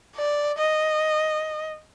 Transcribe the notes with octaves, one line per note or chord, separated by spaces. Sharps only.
D5
D#5